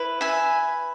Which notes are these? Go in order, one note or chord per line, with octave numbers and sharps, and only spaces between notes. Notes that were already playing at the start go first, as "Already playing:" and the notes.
Already playing: E4 B4
E5 G#5